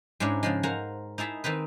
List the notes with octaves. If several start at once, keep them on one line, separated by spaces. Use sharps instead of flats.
G#2 G#3 C#4 D4 E4
C#3 F3 G#3
A#4 C5 F5 F#5 G#5 A#5
D#4 E4 G#4 A5 B5
D#3 C4 D#4 B4